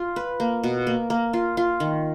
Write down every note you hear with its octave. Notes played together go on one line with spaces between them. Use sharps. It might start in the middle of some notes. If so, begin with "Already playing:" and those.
Already playing: F4
B4
A#3
B2
A#3
A#3
F4
F4
D#3